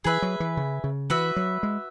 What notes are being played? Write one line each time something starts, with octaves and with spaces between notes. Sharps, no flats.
E3 G#4 B4 E5
F#3
E3
C#3
C#3
E3 F#4 B4 E5
F#3
G#3